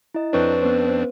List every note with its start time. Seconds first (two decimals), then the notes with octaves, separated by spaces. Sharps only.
0.15 E4 D#5
0.33 F2 C4 D4 B4 C#5 C#6 F#6
0.61 B3 C#4 C5